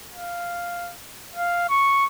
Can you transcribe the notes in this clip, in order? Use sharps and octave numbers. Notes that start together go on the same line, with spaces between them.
F5
F5
C#6